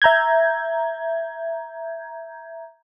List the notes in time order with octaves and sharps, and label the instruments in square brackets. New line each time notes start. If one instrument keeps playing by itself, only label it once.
[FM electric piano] E5 A#5 G6 G#6